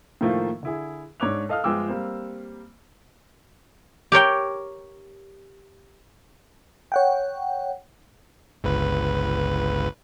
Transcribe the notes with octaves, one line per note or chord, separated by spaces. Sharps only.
A2 D#3 F3 A3 A#3
D3 E4 G#4
G#2 D4 C#5 D6 F#6 F7
A4 D#5 F5 D#6 F6
G1 F3 G#3 G5 D6 E6
G3 A#3 C4
G4 A#4 C#5 G5
C#5 F#5 G5
G1 C#2 B4